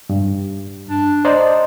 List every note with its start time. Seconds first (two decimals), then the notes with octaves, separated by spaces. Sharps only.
0.09 G2
0.90 D4
1.25 C5 D5 D#5 A#5